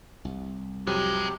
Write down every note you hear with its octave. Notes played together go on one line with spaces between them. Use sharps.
C2
B1 F2 C3 F#3 G#3 G4